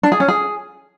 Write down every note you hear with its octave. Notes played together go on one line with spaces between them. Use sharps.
D4
G#4
C#4
G#4